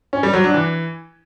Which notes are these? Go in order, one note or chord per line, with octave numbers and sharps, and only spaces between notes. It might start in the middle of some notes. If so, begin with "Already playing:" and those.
C#4
G3
F#3
D4
E3